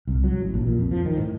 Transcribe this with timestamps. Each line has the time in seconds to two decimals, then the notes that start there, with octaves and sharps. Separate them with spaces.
0.08 C2
0.24 F#3
0.41 A1
0.54 A#1
0.66 A#2
0.79 F2
0.91 F3
1.06 D#3
1.18 A2